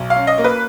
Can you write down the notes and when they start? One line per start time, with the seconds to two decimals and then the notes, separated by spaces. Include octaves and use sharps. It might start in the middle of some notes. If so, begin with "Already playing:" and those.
Already playing: B1
0.10 F5
0.16 C#4
0.27 D#5
0.38 A#3
0.44 B4